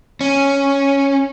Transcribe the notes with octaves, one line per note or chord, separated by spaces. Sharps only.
C#4